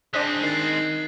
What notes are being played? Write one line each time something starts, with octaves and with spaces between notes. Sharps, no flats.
G#3 C4 D4 C5 D#6 F#6 B6
D#3 A6 C7